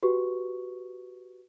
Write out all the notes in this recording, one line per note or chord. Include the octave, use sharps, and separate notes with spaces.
F#4 G4 B4 C#6